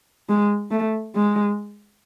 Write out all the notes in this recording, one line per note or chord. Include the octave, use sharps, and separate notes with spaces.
G#3
A3
G#3